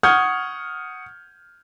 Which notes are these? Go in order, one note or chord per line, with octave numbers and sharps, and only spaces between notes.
F#5 C#6 D#6 F6 G6 G#6